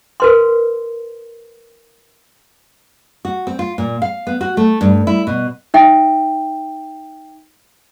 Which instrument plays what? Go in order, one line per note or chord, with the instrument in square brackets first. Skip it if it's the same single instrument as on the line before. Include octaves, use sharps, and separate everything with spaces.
[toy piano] A#4 B4 C6
[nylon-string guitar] F#4
C4
F4
A#2
F5
B3
F#4
A3
G2
E4
B2
[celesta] D#4 E5 G5